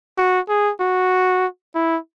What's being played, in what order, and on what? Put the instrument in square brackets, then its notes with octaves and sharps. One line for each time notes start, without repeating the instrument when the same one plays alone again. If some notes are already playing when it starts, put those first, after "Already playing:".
[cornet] F#4
G#4
F#4
E4